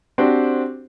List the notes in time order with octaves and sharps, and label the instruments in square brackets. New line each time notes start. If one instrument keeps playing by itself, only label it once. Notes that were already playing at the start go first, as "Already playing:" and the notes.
[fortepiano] C4 D4 F#4 G4 C5